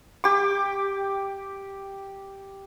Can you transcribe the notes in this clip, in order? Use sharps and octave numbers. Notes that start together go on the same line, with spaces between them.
G4 D6